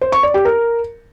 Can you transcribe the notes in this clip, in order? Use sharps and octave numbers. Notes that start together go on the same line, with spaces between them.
C5
C#6
D5
G4
A#4